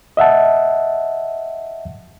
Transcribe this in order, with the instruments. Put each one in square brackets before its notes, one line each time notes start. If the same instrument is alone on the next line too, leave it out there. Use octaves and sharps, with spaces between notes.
[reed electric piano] D#5 E5 F#5 A5